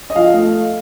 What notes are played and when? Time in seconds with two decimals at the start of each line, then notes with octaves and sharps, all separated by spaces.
0.10 D#5
0.16 F3 F5
0.34 A3